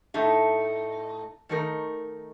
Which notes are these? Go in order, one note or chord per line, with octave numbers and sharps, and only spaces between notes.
A2 A3 D#4
D#3 A3 D#4 A#4